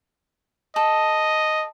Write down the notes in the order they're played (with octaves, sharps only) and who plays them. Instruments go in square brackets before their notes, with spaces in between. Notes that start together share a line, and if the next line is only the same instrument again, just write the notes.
[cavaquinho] A4 [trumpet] D#5